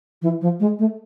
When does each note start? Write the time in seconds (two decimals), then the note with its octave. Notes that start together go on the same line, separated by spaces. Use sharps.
0.22 E3
0.41 F3
0.60 G#3
0.79 A3